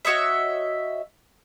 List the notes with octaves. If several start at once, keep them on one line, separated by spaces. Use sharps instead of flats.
F#4 C#5 D#5 E5